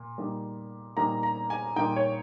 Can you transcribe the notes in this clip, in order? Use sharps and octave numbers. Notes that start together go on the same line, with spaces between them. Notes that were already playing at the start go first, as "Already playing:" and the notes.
Already playing: A#2
A#2 G3 A#3 D#4
A#2 G3 A#3 D#4 A#5
A#5
G#5
A#2 G3 A#3 D#4 G5
C#5